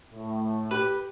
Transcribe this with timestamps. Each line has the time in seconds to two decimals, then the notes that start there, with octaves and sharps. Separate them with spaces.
0.12 A2
0.71 G4 B4